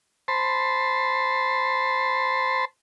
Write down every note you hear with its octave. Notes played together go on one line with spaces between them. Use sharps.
C5 A5 B5 C6